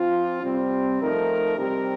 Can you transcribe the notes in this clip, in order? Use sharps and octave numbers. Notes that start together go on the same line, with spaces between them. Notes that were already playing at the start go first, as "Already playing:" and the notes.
Already playing: F3 C4 F4
C3 G3 C4
F3 A3 D#4 A#4
C3 G3 C4 G4 A#4